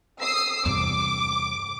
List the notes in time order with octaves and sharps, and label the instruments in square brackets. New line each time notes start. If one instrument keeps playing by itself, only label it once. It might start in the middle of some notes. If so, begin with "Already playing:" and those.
[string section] D#6 E6 C7
[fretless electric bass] E2 G2 C3 [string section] D6